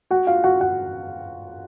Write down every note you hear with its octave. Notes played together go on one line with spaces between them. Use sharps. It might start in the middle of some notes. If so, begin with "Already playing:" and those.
F#4 F#5
F4 F5
F#4 F#5
F#4 F#5